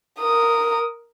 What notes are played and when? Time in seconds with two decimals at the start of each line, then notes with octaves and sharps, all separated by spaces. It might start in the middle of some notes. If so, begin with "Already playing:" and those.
0.19 A#4 D#6